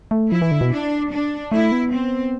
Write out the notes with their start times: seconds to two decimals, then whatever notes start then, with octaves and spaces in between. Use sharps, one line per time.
0.11 A3
0.31 F3 E4
0.42 E3
0.51 D3
0.61 B2
0.72 D4
1.11 D4
1.52 A3 E4
1.72 B3
1.91 C4